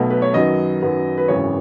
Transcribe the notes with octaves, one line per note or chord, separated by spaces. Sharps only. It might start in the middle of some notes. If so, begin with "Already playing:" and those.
Already playing: B1 B2 F#3 A3
B4
C#5
F#2 D#3 F#3 B3 D#5
F#2 D#3 F#3 B3
B4
G#1 F#2 C#3 E3 C#5